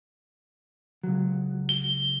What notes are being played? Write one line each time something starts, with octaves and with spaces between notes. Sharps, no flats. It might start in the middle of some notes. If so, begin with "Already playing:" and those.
C#2 F#3
G7